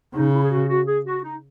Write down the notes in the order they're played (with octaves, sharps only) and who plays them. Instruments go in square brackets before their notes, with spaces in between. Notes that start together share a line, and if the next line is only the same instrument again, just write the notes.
[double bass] C#3 [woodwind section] D#4
[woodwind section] E4
G#4
F#4
F#4
G#4
F#4
D#4